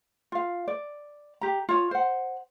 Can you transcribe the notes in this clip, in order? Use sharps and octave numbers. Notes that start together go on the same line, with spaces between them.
F4 F5
D5
G4 A#5
F4 C#5
C5 F#5